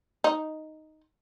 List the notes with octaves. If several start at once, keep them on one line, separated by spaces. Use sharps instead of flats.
D#4